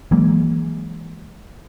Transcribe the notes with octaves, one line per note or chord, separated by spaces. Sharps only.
E3 F#3 G#3 A#3